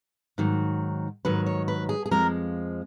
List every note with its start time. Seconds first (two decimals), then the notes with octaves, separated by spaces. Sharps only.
0.38 G#2 D#3 F#3
1.25 G#2 D#3 F#3 B4
1.46 C#5
1.68 B4
1.89 G#4
2.06 G#4
2.11 F2 F3 G#3 A#4